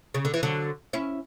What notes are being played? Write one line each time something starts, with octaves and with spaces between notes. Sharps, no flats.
C#3
D3
E3
D3 F#3
C#4 E4